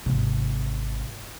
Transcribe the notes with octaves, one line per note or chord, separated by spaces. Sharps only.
G#1 C3